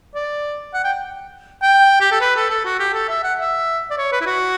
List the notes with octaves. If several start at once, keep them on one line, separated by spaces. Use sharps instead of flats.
D5
F#5
G5
G5
G4
A4
B4
A4
A4
F#4
G4
A4
E5
F#5
E5
D5
C#5
B4
E4
F#4